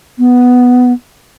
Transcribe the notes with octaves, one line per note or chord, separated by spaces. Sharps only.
B3